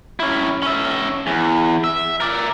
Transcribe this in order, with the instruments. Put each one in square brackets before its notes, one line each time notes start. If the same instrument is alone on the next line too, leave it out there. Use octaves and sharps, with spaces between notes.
[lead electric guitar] C#4 E4
C#4 E5
E2
E5
A#4 D5